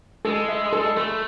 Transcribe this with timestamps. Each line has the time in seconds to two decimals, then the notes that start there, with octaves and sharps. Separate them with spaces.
0.25 G#3 A4
0.49 E5
0.73 A4
0.97 A3 A4